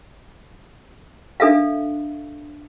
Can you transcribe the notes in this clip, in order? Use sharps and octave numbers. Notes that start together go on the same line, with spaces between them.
D4 A4 E5 F5